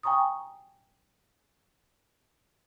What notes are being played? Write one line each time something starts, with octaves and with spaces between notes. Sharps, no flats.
G5 G#5 A#5 C#6 D#6